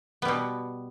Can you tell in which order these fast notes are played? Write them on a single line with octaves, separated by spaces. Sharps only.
B3 G3 B2